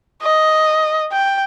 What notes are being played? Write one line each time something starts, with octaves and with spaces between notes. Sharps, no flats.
D#5
G5